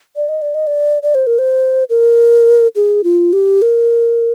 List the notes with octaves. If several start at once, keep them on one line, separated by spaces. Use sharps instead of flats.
D5
D#5
D5
D#5
D5
D5
C5
A#4
C5
A#4
G#4
F4
G4
A#4